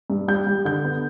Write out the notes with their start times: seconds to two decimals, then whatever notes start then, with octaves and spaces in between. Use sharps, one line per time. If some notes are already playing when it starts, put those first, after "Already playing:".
0.10 G2
0.28 G3 G6
0.47 G3
0.65 D3 G6
0.84 B3